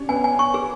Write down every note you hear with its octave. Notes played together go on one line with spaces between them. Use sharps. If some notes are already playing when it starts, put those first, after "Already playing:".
Already playing: C#4 D4 C#5 D5
B3 B4 G#5
G#5
C#6
G#4